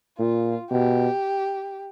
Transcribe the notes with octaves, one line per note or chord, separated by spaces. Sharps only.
A#2 F4
B2 G4